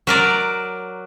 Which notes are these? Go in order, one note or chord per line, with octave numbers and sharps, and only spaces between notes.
F#3 A#4 D5